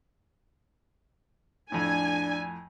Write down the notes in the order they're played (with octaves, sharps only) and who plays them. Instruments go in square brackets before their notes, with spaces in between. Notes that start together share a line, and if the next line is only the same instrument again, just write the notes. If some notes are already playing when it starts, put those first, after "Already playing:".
[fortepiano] F2 A2 [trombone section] D4 [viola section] G#5